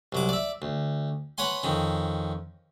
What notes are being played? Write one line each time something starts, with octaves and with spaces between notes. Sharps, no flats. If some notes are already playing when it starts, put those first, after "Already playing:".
C2 F#3 D6
D5 E5
D2
B4 C#5 F#5 G#5 C6
F2 D#3 C#4